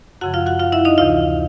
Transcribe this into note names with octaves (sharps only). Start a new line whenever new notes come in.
F#2 C#3 F3 F#4 F#5
F4 F5
F#4 F#5
F4 F5
E4 E5
D#4 D#5
D2 C3 E3 F4 F5